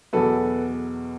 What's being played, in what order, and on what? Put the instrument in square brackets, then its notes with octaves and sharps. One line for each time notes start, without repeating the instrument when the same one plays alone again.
[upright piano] E2 B2 F#3 A4 B4